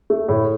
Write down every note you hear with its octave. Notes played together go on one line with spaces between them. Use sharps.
A3
A2